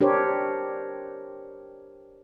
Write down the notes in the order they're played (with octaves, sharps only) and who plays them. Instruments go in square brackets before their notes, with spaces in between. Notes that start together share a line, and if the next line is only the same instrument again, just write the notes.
[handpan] D4 G4 A#4 C5 C#5